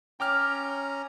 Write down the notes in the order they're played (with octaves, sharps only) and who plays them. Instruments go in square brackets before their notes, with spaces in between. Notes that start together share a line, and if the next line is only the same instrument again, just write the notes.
[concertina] C#4 A#5 [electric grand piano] G5 D6 F6